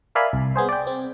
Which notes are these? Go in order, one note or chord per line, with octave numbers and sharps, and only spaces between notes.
A#4 D5 E5 F5 G#5 B5
C2
B3 G#4 C5
D5 G5
C4